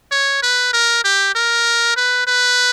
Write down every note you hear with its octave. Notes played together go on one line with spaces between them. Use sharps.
C#5
B4
A#4
G4
A#4
B4
B4